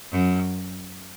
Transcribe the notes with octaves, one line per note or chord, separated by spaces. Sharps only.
F#2